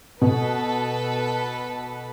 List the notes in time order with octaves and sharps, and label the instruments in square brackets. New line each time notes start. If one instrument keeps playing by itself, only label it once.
[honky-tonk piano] B2 [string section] A4 B4